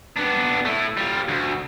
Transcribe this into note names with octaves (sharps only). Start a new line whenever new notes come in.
B3 D4
A3 E4
G3 F4
D2